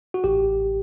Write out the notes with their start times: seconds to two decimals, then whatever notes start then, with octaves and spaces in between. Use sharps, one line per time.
0.14 F#4
0.24 A1 G4